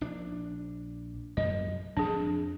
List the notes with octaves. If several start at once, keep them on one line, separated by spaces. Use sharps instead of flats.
A#1 D4
F#2 D#5
F2 D4 G#4